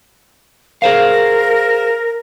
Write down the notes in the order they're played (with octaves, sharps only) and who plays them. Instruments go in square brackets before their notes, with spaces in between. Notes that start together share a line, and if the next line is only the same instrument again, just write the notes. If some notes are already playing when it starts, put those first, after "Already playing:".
[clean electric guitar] G#4 C5 F5 [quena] A#4